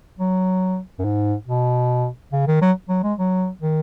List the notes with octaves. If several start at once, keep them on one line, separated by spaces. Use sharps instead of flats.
F#3
F#2
G#2
B2
C#3
D#3
F#3
F#3
G#3
F#3
D#3